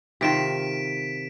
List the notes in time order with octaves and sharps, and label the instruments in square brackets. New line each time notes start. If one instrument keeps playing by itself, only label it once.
[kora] C3 D#3 F4 [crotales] B6 D7 E7